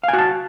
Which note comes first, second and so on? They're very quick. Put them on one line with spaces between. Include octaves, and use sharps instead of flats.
F5 G#5 F#4 A5